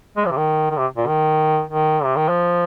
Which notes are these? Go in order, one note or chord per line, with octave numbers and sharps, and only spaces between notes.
G#3
F3
C3
D#3
D#3
C3
A#2
D#3
D#3
C3
D#3
F3